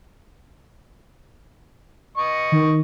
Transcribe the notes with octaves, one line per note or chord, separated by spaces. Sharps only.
D#5 C#6
D#3